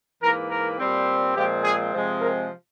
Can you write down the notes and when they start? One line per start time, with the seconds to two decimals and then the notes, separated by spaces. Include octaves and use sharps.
0.22 G#2 E3 A#3 A#4
0.50 A#4
0.79 A#2 G3 C4
1.36 A#2 F3 G#3 C4 G4
1.64 G#4
1.92 C3 F3 G#3 C4
2.21 A#4